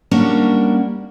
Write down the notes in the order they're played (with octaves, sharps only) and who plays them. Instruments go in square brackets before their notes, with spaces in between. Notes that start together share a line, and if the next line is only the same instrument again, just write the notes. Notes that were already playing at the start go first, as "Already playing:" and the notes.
[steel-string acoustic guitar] G3 A#3 C#4 D4 F#4 A#4